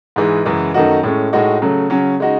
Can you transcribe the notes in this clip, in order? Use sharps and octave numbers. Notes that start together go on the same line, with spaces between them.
G#2 E3 G#3
F#2 C#3 E3 G#3
F#2 D#3 A3 D#4 F#4
A2 G#3 C#4
A2 G#3 D#4 F#4
C#3 F#3 A3
C#3 F#3 C#4
C#3 G#3 D#4 F#4